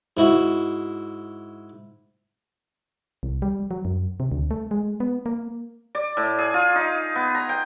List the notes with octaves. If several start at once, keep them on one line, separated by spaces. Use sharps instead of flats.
G#2 E4 F#4
C2
G3
F#3
F#2
C3
D2
A3
G#3
B3
A#3
D5
A2
G#4
F4
D#4
B3
A#5
G5